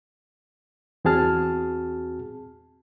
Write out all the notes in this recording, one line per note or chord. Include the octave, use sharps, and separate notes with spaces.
E2 C4 F#4 G#4 A5 F6